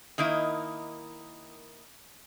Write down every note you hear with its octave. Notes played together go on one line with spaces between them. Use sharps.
D#3 A#3 D#4 E4